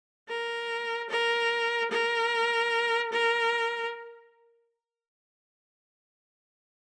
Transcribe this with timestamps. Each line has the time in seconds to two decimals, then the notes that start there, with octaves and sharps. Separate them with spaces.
0.29 A#4
1.09 A#4
1.91 A#4
3.12 A#4